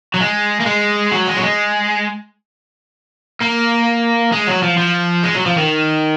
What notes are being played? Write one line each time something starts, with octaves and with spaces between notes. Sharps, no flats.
F#3
G#3
A#3
G#3
F#3
G#3
F#3
G#3
A#3
G#3
F#3
F3
F3
G#3
F#3
F3
D#3